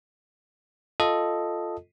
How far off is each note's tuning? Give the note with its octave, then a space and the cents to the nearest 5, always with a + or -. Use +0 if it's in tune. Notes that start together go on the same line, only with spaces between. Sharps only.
F4 +0 A4 +0 D#5 +0